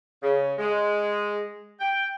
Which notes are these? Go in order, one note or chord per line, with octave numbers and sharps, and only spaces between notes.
C#3
G#3
G5